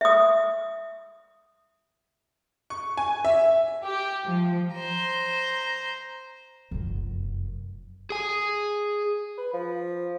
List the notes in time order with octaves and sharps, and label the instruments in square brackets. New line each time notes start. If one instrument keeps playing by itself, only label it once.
[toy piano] E5 D#6
[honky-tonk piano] C#6
G#5
E5
[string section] G4
F3
[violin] C5 A#5
[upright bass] F1 F#2
[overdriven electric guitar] G#4 G#5
[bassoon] B4
F3